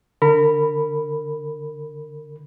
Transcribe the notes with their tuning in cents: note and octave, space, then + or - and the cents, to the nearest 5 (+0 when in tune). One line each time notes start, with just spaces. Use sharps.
D3 +0 A#4 -30 B5 +0